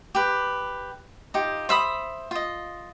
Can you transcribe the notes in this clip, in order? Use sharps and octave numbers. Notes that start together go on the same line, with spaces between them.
G4 B4
D#4 F4 G4
C5 E5 B5 D#6
F4 D#5